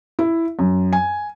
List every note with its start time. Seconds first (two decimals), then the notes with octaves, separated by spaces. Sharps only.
0.19 E4
0.59 F#2
0.93 G#5